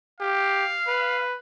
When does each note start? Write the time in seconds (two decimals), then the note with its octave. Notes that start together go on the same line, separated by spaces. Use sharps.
0.20 G4 F5
0.88 B4